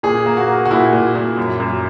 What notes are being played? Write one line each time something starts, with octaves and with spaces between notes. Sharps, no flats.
A#2 G#4
A#3
F#4
A#3
F#4
A#2 E4
A#2
A#2
F#2
F#2